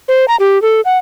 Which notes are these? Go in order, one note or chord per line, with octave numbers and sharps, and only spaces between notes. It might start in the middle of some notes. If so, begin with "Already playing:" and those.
C5
A#5
G4
A4
F#5